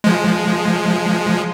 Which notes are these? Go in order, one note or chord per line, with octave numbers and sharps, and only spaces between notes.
F3 G#3